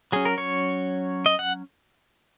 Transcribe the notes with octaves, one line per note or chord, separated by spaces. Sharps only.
F#3 C#4 G#4
A#4
C#5
D#5
F#5